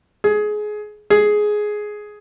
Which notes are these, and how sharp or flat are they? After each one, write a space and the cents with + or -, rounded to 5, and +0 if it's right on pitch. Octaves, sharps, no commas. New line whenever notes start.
G#4 +20
G#4 +10